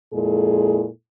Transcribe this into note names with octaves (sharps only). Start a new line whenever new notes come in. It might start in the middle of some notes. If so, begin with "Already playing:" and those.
F2 A#2 G#3 E4 G#4 A4